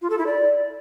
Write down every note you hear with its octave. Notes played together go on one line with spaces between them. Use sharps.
F4
A4
E4
D5